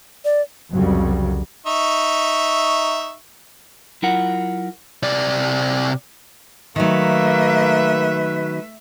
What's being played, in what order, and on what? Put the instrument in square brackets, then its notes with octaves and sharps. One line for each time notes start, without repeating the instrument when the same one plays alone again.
[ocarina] D5
[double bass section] C2 F2 C#3 F#3 G3
[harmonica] D#4 E5 C#6
[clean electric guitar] F#3 E4 F4 A#4 F#5
[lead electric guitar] C3 D5
[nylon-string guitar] D#3 F#3 [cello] A3 E5 [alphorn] A#3 [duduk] B4